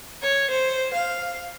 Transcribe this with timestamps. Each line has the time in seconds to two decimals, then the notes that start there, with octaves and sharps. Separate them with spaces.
0.22 C#5
0.50 C5
0.94 F5